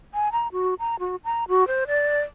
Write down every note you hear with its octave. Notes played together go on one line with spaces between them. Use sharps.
G#5
A#5
F#4
A#5
F#4
A#5
F#4
C5
D5